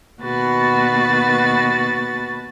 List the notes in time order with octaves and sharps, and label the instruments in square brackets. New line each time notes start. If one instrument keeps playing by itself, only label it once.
[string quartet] D#2 B2 F#4 B4 A6